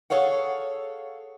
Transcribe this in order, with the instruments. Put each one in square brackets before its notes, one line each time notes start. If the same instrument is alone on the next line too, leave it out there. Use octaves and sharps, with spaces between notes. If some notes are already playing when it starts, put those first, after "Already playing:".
[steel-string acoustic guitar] G#4 A4 C#5 F5 F#5